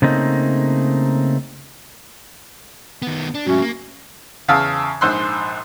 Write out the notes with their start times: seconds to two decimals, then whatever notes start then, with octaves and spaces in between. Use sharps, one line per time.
0.02 C#3 A3 A#3 C4 D#4
3.02 D#3 B3
3.35 D4
3.46 G#2 F#3 A3 C#4 F#4
3.61 A#3
4.48 E2 C#3 F5 A5 E6
5.01 A#1 G#2 C5 C6 E6 F#6